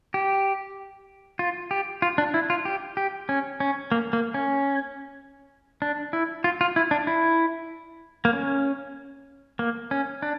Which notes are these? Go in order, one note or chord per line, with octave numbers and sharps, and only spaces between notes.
G4
F4
G4
F4
D4
E4
F4
G4
G4
C#4
C#4
A#3
A#3
C#4
D4
E4
F4
F4
E4
D4
E4
A#3
C#4
A#3
C#4
D4